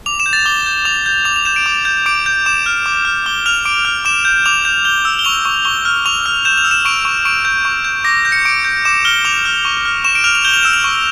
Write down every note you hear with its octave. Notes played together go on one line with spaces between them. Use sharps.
D6 F7
E7
G6
A6
D6 G7
G6
D6 F7
G6
D6 F7
F7
G6 E7
D7
D6
G6
D6 D7
G6
D6 E7
F6
D6
F6
D6 G7
F6 F7
D6 D7
F6
D6 E7
G6
D6 F7
G6
G6 G7
E6
G7
C#6 F7
C#6
C#6 G7
F6
C#6 F7
F6
G6 E7
F7
E6
E7
C#6 D7
C#6
C#6 D7
G6
C#6
G6
D6 A#6
G6
C#7
D6 D7
G6
D6 E7
F6 G7
D6 F7
F6
C#6
F6
C#6 E7
D7
F6 F7
F7
G6 G7
F7
E6 E7
F7
C#6